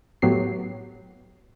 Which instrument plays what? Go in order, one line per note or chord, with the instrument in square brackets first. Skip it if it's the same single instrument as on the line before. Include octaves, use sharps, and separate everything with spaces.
[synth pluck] A2 F#3 B3 G4 C7